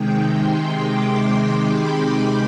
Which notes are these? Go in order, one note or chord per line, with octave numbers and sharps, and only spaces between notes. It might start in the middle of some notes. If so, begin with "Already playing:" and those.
Already playing: C3 D#3 G#3 G5
C6
D6
C6
B5